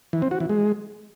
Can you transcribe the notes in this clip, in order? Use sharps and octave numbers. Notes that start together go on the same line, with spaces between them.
E3
C4
F#4
E3
G#3